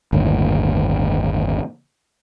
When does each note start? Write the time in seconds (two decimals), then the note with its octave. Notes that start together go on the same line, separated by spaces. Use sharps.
0.13 G1 D#2 A2